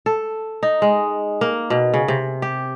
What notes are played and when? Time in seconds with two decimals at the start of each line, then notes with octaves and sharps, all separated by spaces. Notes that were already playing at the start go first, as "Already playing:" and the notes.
0.06 A4
0.63 D#4
0.82 G#3
1.41 A#3
1.70 B2
1.94 C#3
2.08 C3
2.42 G4